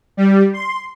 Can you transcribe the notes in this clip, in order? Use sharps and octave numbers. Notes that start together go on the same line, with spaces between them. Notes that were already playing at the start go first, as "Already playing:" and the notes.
G3
C6